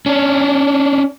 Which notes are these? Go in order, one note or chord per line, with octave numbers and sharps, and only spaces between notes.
C#4 D4